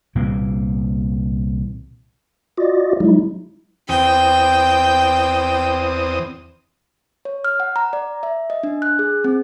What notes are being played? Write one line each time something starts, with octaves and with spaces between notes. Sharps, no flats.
C2 A#2 E3 A#3
F4 F#4 D5 D#5
F#3 G#3 D#4 E4
E2 C4 G5 D#6
C#5
F6
F#5
A#5
D5
E5
D#5
D4
F#6
G#4
C4